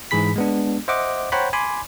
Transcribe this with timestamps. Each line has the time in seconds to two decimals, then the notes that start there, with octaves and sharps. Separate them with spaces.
0.11 G#2 E3 G#4 B5 B6
0.36 G#3 B3 D4
0.88 C5 D#5 E5 F#5 D6
1.32 C5 C#5 F#5 G5 A#5 B5
1.53 G#5 B5 C6 D6